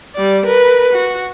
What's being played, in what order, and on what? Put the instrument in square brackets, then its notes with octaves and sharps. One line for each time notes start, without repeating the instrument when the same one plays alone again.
[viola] G3 D5
A#4 B4
F#4